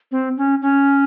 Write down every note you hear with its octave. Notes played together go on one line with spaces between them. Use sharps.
C4
C#4
C#4